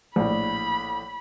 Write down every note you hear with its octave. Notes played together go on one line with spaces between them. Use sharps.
A#1 A2 B5